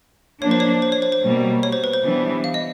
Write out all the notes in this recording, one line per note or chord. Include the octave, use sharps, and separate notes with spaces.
F3 A#3 D4 C#5
C5
C#5
C5
C#5
C5
C5
B2 G3 A#3
C#5
C5
B4
C5
E3 G3 B3 D4
F5
D#5